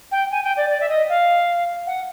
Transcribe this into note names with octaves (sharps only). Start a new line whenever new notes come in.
G5
G#5
G5
D5
D5
E5
D#5
F5
F#5